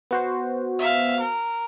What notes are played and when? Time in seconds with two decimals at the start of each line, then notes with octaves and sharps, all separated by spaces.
0.11 B3 F#4 C5
0.79 E5 F5
1.20 A#4